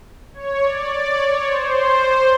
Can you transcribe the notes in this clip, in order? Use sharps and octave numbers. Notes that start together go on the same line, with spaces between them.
C#5
D5
D5
C#5
C5